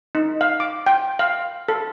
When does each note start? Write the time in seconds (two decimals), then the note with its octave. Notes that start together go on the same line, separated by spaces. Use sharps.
0.15 D#4
0.41 F5
0.60 D6
0.86 G5
1.19 F5
1.68 A4